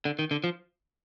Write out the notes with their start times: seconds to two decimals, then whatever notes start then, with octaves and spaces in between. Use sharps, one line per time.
0.05 D3
0.19 D#3
0.31 D3
0.44 F3